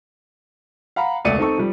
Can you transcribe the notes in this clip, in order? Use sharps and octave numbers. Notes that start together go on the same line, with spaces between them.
F5 F#5 A#5 B5
E1 C#2 A3 D5 C#7 D#7
C4 D#4 A4 C#6
F3 G3